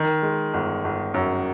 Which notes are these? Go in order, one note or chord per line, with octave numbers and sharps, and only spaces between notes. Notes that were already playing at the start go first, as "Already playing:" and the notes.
Already playing: D#3
G#3
G1
G1
F#2